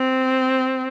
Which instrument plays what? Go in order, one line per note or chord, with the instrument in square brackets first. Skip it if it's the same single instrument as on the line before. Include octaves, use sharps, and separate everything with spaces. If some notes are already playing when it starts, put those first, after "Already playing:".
Already playing: [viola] C4